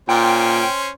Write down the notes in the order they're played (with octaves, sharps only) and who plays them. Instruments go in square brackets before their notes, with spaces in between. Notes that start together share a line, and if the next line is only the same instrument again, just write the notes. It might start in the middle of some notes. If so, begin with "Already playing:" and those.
[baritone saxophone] A#2 [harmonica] C#4 C5 [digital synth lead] G5